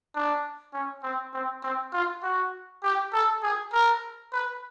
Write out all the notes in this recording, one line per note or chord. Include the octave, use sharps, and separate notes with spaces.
D4
C#4
C4
C4
C4
F4
F#4
G4
A4
G#4
A#4
B4